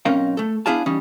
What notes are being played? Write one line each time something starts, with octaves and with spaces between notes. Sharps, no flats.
B1 C4 C#4 D#4 A#4 F5
A3 A4
B3 D4 E4 G#4 F5 A5
E3 G3 C#4 D#4